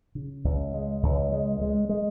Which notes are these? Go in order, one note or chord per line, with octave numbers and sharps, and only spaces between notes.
C#3
C#2
G#3
C#2
G#3
G#3
G#3